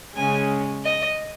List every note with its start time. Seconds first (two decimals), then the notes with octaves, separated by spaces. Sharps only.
0.15 C#3 G#3 C#4 G#5
0.84 D#5